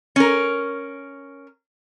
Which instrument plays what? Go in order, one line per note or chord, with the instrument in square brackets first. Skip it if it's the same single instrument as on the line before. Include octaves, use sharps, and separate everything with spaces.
[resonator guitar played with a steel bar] C#4 A#4